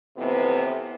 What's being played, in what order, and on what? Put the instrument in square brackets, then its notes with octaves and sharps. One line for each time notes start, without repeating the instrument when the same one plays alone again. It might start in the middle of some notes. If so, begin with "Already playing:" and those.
[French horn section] F2 A2 C3 E3 B3 C4